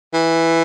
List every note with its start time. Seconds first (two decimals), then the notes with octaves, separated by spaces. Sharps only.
0.14 E3